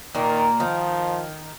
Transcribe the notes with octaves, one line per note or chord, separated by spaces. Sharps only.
A#2 D#3 A#3
D#3 F3